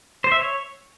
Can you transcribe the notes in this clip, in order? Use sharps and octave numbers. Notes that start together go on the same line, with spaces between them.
C5
E5
C#5